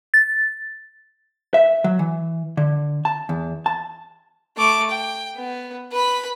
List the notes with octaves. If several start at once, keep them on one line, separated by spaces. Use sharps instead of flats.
A6
E5
F#3
E3
D3
A5
E2
A5
A3 D6
G5
B3
B4 B5